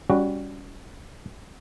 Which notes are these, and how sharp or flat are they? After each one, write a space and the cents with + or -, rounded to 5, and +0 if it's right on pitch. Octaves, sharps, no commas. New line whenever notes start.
G3 +10 C#4 +25 F#4 +0